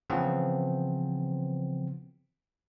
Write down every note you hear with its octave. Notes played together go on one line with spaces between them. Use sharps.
C#3 E3 F3 B3 C4